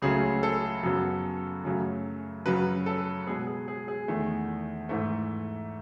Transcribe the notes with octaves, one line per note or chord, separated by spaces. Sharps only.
C#2 C#3 F#3 A3 G#4
A4
F#2 C#3 F#3 B3
F#2 C#3 F#3 A3
F#2 C#3 F#3 B4
A4
B2 G#3 B3 G#4
G#4
G#4
G#4
E2 D#3 A3
G#2 E3 A3